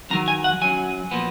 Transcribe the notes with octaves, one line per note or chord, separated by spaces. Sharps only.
F#2 D#3 F#3 A#5
G#5
F#5
F#2 D#3 F#3 G#5
A#2 F3 B3